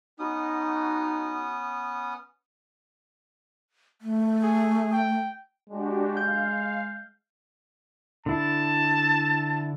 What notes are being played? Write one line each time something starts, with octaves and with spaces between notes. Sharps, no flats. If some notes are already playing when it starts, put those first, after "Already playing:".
B3 C#4 D#4 F#4 D#6
A3
G#4
G5
G#3 D4 F#4 G4
F5 G6
D3 E4 A5